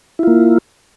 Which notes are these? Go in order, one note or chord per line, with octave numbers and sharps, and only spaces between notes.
A#3 E4 F4